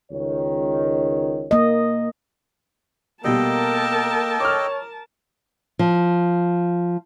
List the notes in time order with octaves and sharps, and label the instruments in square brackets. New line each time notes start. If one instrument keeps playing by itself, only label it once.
[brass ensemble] C#2 D#3 C#5
[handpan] A#3 D#5
[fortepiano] B2 G3 [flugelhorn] A#3 [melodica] A4 D#5 G5 [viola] A#4 A5
[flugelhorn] C#5 [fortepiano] D6 F6
[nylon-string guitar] F3